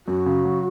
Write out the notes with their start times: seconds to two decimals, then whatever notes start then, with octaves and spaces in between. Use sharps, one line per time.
0.07 F#2 F#4
0.26 C#3
0.45 F#3